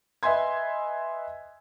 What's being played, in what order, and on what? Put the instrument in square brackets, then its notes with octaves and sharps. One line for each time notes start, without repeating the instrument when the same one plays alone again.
[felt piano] B4 D#5 E5 G#5 C6 G#6